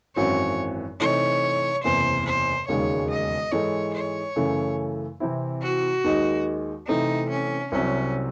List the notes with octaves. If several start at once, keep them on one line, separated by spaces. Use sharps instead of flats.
G#1 F#2 E3 C4 F#4 C#5
C3 E3 A3 D#4 C#5
F#1 E2 C3 C5
C5
E1 D#2 C#3 G#3 C#5
D#5
G#2 E3 G#3 D#4 A4 C#5
C#5
F#2 C#3 E3 A3
C3 E3 C4 E4
F#4
D#2 D#3 G#3 D#4
C3 E3 A3 C4 D#4
C#4
C2 C3 F#3 C#4